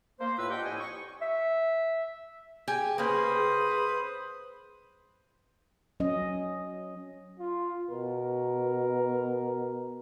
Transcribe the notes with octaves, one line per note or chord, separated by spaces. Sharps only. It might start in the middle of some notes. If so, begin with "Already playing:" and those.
A#3 C5
A2 F4 B4 E6
D4 G4 D#5 F#5 G5
F2 A2 E4 D#5 G#5
C#6
E5
G4 G#4 G5 G#5
C#3 A#3 B4 C5 D#6
F#3 C#4 D#5
F4
B2 A#4